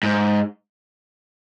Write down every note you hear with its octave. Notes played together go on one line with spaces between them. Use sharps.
G#2